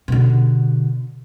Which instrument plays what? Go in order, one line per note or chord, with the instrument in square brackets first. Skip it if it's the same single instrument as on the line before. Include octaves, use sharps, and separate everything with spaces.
[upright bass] B2 D3